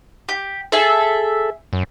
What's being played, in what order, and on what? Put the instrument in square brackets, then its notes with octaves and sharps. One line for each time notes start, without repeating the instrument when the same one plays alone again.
[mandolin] G4
[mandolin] G#4 E5 [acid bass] A4
[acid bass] F#2